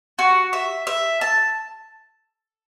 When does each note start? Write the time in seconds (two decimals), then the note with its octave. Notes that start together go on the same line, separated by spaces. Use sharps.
0.19 F#4
0.53 E5
0.87 E5
1.21 A5